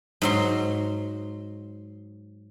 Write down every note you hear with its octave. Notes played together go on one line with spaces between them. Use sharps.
G#2 F#3 C6